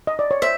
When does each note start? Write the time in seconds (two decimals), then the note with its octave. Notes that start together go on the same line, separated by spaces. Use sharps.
0.07 D#5
0.19 D5
0.31 C#5
0.42 C5 E5